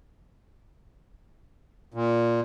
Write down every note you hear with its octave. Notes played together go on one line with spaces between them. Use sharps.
A#2